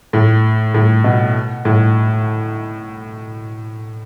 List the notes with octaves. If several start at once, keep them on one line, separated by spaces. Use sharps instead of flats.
A2
A2
B2
A2